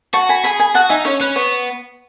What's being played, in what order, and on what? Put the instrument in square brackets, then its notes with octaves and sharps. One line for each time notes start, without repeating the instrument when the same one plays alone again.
[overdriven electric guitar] F#4 [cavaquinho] A5 C#6
[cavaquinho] G#5 B5
[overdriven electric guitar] G#4 [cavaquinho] G#5 B5
[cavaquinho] G#5 B5
[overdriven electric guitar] F#4 [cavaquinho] F#5 A5
[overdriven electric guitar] D#4 [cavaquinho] E5 G#5
[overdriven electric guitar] C#4 [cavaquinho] C#5 E5
[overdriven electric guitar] C#4 [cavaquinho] B4
[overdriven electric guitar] B3 [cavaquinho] C#5